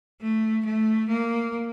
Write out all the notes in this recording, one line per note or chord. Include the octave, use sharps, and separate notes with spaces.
A3
A3
A#3